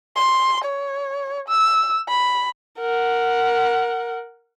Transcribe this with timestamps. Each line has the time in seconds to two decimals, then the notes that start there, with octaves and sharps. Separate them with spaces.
0.17 C6
0.65 C#5
1.49 E6
2.09 B5
2.79 A#4 F#5